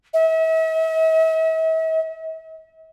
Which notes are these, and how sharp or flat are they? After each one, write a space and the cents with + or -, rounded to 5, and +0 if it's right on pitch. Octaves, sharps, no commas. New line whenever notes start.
E5 -40